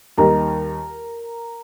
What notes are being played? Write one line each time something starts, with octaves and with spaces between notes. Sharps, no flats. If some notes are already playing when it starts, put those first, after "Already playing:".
D#2 D#3 G3 A#4